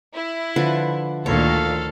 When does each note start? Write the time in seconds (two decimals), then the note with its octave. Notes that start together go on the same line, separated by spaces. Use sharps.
0.14 E4
0.56 D3 F3 B4
1.26 D2 A#2 D#3 A4 C#5 F5